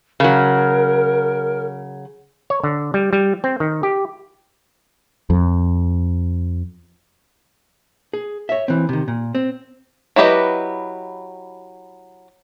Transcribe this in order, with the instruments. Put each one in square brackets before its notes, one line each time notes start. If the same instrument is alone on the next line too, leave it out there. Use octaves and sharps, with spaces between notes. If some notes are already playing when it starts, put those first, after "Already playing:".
[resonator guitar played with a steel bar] C#3 F#3 [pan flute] A#4
[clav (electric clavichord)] C#5
D3
G3
G3
C4
D#3
G4
[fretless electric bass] F2
[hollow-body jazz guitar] G#4
C#5 E5
E3 C4
C3 D#3
A#2
C4
[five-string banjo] F#3 E4 G4 B4 D#5